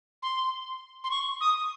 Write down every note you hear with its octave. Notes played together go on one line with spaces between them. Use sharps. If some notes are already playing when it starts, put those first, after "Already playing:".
C6
C6
C#6
D#6